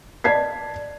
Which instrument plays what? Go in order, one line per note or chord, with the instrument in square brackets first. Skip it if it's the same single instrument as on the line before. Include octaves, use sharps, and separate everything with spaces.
[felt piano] D5 D#5 A5 G#6 B6 C7